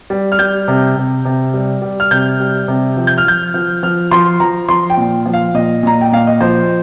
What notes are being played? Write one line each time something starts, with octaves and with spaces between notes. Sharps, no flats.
G3
F6
G3 G6
C3
C3
C3
G3
G3
F6
C3 G6
G3
C3
F3
G6
F6
F3 G6
F3
F3 F6
F3 C6
F3 A#5
F3 C6
G5
A#2
F3
F5
A#2 D#5
A#2 A#5
G5
A#2 F5
D#5
F3 C5